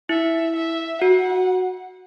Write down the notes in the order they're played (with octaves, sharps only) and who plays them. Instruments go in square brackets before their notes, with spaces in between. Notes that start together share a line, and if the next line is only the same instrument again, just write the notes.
[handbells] E4 [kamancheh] E5
[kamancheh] E5
[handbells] F#4 [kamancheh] F#5